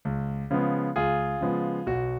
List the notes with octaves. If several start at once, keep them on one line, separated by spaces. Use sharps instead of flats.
C#2
C#3 F3 G#3 B3
C#2 F4 G#4
C#3 F3 G#3 B3
B1 F#4